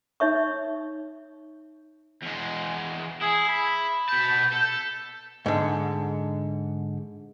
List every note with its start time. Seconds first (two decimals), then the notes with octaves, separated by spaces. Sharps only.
0.20 D#4 C#5 E5 C#6
2.22 E2 G#3
3.22 E4 G#4
3.49 B5
4.09 B2 A5 G6
4.52 A4
5.46 G#2 D3